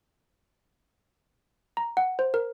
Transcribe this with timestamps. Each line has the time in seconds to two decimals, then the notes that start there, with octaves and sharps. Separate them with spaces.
1.77 A#5
1.97 F#5
2.19 C5
2.34 A#4